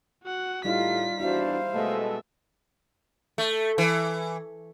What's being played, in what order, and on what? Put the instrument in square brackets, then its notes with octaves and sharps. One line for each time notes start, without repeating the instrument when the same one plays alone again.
[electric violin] F#4 F#5
[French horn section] A2 [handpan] G3 D#4 F5 [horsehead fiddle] F4 [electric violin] B6
[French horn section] E2 D4 F#4 [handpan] E4 [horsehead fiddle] C5 F5
[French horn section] B2 G#3 A3 [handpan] A4 D#5 [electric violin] E5
[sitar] A3
E3